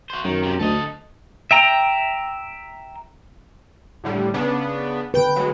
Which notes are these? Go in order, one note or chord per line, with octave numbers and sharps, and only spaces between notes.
F#4 C5
F#2 D#3
G#2 C3
D2 A4 D#5
E5 G5 A#5
A2 D3 G3
C#3 B3 D4
D3 B4 G5 G6 D7
F#3 G#3